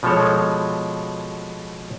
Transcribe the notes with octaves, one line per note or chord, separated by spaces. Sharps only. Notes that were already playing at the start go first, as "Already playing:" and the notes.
B2 F3 G#3 A4 C#5